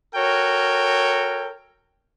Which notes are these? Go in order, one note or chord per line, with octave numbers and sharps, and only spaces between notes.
F#4 A4 A#4 C#5 G5